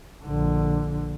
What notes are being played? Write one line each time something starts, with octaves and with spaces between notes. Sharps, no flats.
A#1 D3